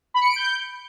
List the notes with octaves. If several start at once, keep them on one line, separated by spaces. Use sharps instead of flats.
B5
C#7
D7
G6